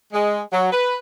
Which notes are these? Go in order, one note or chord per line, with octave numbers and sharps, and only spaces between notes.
G#3
F#3
B4